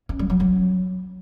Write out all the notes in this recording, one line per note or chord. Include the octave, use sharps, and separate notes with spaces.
C#4
G3
F#3
F#3